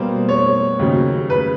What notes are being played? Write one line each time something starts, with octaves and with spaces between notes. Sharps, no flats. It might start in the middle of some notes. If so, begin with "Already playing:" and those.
Already playing: B2 G3 A#3 C5
C#5
D#2 C#3 F#3
B4